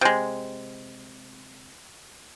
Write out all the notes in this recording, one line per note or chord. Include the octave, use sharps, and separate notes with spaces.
C3 G#3